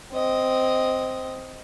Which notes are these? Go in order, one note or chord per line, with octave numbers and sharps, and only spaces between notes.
C4 D#5